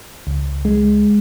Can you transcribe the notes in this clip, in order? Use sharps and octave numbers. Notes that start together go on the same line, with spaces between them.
C#2
G#3